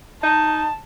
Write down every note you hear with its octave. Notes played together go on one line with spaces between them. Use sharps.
D#4 A5